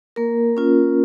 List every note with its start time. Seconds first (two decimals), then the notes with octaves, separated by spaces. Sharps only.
0.16 A#3 A#4
0.57 C#4 F4